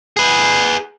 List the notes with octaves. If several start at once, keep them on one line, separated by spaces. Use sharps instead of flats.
G#4 B4